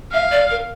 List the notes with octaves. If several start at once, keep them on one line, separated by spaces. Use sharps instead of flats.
E5 F5
D5
A#4